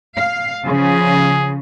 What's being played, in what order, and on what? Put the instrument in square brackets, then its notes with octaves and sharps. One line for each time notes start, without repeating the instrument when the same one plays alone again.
[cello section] F5
[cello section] C#3 F3 [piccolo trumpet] G#4